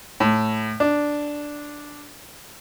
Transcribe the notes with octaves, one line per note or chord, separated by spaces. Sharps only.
A2
D4